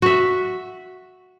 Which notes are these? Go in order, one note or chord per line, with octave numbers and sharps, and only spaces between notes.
F#4 E5